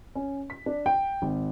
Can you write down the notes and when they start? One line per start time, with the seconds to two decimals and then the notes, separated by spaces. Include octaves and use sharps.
0.15 C#4
0.50 B6
0.66 D4
0.86 G5
1.22 G#1